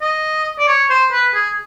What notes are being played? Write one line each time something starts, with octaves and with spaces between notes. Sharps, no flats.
D#5
D5
C#5
C5
B4
G#4